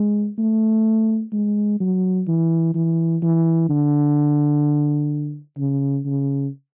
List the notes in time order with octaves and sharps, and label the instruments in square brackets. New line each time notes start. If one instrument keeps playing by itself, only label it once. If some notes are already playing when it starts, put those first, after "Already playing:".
Already playing: [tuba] G#3
A3
G#3
F#3
E3
E3
E3
D3
C#3
C#3